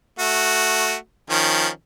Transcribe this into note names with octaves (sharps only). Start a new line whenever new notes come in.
A3 F#4
D#3 F3 C#4